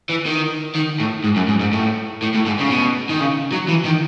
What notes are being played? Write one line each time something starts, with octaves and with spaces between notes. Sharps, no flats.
E3
D#3
D#3
A2
G#2
F#2
G#2
G#2
A2
A2
A2
G#2
C#3
B2
D#3
C#3
F#3
E3
D#3